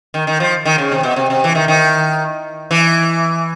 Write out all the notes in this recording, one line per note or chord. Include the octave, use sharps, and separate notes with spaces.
D#3
D#3
F3
D#3
C#3
C3
B2
C3
C3
E3
D#3
D#3
E3